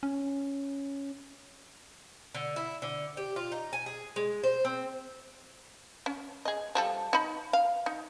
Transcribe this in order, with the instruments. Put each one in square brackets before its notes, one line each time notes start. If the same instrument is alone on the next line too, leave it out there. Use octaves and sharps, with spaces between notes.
[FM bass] C#4
[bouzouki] D3
E4
D3
G4
F4
D#4
G#5
G#4
G#3
C5
C4
[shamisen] C#4
G#4 D#5
F3 G3 A4
D#4 B5
F5
D#4